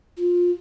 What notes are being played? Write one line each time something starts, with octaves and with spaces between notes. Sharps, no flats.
F4